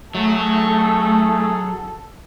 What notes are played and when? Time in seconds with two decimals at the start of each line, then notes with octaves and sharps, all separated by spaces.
0.15 F#3 A3 G#4 A4